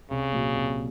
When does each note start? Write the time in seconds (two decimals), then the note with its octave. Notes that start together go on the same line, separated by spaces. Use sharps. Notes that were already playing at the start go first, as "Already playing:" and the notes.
0.10 C2 C#3
0.33 A#2 F#3
0.55 C2